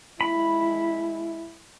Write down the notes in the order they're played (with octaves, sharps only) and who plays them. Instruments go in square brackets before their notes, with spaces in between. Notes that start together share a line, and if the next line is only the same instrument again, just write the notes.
[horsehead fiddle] G#3 E4 [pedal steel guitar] B5